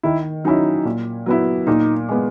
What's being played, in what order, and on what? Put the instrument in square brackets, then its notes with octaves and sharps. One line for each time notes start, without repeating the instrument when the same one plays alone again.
[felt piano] D#3 [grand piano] E4
[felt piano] F#3 C#4 E4 [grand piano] D#4
[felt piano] A#2
F#3 B3 E4
[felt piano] A#2 [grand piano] D#4
[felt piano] G#3 B3